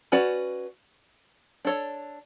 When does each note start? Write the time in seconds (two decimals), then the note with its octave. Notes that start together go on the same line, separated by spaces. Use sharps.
0.12 C#4 F#4 B4 D5
1.65 D4 A4 C#5